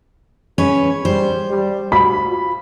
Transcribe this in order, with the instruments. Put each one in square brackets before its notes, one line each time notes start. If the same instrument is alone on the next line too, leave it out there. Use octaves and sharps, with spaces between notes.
[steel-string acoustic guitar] C#4 B4 C#5 [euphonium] G#4
[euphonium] G3 [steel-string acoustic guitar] C5
[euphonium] G3
[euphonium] F#4 [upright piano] B5
[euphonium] F4